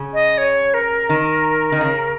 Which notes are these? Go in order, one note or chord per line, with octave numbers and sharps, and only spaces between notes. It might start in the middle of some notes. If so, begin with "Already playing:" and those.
Already playing: C#3
D#5
C#5
A#4
D#3
D#3
C#3